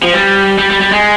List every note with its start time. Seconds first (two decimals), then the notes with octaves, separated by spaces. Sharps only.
0.03 F3
0.14 G3
0.58 G3
0.70 G3
0.81 G3
0.92 G#3